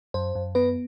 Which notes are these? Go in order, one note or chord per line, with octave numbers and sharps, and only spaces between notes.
F#2 C5
F#2
B3 B4